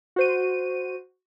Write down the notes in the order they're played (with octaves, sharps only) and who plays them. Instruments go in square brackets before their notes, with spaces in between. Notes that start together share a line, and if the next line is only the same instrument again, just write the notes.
[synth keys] F#4 C5 D#7